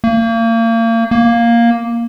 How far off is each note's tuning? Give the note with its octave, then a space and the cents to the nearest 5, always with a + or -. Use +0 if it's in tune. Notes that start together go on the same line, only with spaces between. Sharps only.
A#3 -35
A#3 +5